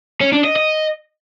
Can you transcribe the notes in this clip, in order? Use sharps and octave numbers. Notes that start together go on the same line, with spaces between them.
C#4
D4
D#5
D#5